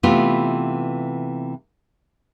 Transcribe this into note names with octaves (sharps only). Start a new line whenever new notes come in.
C3 E3 A3 B3 F4